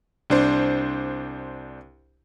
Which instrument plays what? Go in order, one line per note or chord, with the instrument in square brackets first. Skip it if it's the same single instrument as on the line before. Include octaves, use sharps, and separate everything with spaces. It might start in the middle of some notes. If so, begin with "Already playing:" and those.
[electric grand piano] C2 D4 C5